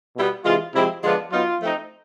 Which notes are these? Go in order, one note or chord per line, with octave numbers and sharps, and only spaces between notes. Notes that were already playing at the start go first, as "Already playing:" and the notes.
B2 G3 B3 E4
C3 E3 G#3 F4
C3 F3 G#3 C4 E4
D3 F3 G#3 B3 D4 F4
F#3 B3 D#4 F4
F3 A3 C4 D#4